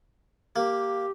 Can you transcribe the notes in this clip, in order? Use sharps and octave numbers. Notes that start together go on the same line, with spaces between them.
A#3 G4